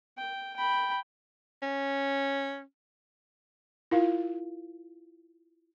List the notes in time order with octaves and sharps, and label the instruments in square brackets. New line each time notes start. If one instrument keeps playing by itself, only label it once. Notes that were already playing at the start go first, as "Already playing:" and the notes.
[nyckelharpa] G5
G5 B5
[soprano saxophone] C#4
[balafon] E4 F4 A#4 F5